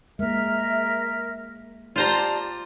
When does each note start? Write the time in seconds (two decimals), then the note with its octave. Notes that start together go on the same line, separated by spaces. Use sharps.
0.19 G#3 A#3 A#4 E5 F6
1.96 F4 G4 C5 D5 A5 A#5